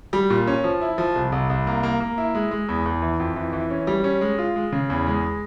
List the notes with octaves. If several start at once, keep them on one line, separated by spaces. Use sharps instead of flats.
G3
A#2
C#4
F3
E4
F3
C2
C2
C2
A#3
A#3
A#3
E4
G#3
G#3
E2
E2
E3
F2
E3
E3
C#4
G3
C#4
G#3
F4
G#3
C#3
E2
G#3